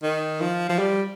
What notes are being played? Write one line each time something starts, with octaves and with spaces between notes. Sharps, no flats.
D#3
F3
F3
G3